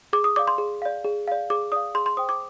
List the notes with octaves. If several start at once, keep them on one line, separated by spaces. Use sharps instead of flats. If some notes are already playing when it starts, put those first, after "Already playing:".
G#4 D6
D#6
D5 F5 D6
C6
G#4
D5 F5
G#4
D5 F5
G#4 D6
D5 F5 D#6
G#4 C6
C6
C5 G5 D#6
D6